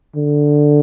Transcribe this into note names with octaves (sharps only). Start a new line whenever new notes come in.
D3